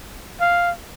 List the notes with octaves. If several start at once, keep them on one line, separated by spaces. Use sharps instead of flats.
F5